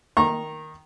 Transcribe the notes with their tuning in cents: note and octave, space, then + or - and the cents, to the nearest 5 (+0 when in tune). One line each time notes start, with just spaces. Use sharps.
D#3 +0 A#5 +0 C#6 -35